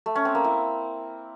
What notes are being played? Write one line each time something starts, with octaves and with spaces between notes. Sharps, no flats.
A3
C#4
C4
A#3
E4